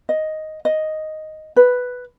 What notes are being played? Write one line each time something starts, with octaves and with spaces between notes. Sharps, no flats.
D#5
D#5
B4